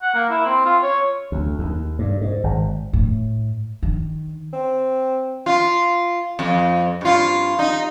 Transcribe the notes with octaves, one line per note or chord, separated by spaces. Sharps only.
F#5
A#3
E4
C4
F4
C#5
D2
D#2
G2
G#2
G#1
A2
D#3
C4
F4
F2
G2 F4
D#4